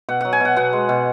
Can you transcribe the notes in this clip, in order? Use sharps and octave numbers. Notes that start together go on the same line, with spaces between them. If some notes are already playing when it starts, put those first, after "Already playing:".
B2 F#5
F#3 F#5
G#5
B2 F#5
B2 F#5
G#3
B2